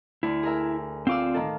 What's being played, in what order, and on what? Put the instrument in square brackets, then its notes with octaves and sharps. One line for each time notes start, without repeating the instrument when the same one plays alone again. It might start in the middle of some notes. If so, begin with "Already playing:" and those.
[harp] D2 [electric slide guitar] E4
[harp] G#4 A#4 E5
[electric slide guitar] C4 F4 D5 [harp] F5 D6 E6
[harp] A2 D#3 A4